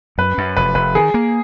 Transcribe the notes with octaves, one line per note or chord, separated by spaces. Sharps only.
F#2 B4
F#2
F1 B4
F1 B4
D#3 G#4
A#3